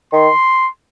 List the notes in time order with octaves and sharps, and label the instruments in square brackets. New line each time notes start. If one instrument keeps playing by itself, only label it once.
[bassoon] D#3 [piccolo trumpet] C6